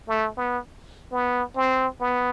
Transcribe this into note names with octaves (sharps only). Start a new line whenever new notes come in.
A3
B3
B3
C4
B3